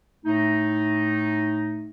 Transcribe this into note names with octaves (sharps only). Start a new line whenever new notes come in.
A2 A3 D#4